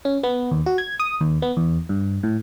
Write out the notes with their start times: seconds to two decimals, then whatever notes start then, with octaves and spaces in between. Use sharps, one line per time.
0.05 C#4
0.23 B3
0.51 D#2
0.66 F#4
0.78 G#6
1.00 D#6
1.21 D#2
1.42 B3
1.57 E2
1.89 G2
2.23 A2